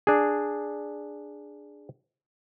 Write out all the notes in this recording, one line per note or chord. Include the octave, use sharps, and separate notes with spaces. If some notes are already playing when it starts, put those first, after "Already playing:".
D4 G#4